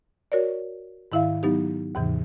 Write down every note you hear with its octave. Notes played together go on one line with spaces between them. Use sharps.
F#4 A#4 C#5 D5
G#2 D#3 E4 E5 F5
F#3 B3 D#4 G4
D#2 G#2 C3 E3